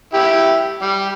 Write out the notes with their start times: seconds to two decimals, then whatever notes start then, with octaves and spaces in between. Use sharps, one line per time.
0.14 E4 G4
0.82 G3